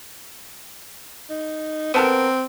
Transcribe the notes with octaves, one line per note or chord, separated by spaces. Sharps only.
D#4
B3 C4 A4 A#4